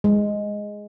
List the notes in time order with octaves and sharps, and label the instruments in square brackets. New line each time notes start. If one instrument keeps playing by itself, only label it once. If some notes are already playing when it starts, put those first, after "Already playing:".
[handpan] G#3